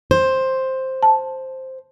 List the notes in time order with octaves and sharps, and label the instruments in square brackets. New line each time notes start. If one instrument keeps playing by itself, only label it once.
[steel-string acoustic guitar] C5
[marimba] A5